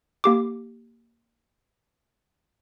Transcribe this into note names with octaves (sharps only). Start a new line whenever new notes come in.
A#3 G4 D6